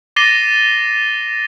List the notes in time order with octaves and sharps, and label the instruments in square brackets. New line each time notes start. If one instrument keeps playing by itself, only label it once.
[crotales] D6 A6 A#6 C7 D#7 G7